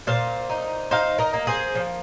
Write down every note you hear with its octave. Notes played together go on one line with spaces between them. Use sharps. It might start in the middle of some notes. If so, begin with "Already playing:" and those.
A#2 C5 F5
D#4
D#4 C5 F5
A#4 D#5
A#3
G#4 C5
F3